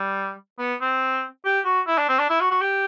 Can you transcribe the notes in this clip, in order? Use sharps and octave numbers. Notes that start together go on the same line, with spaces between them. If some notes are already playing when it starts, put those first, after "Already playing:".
Already playing: G3
B3
C4
G4
F#4
E4
D4
C4
D4
E4
F#4
F#4
G4